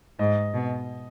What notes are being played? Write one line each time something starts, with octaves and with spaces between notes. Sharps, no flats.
G#2 D#5
B2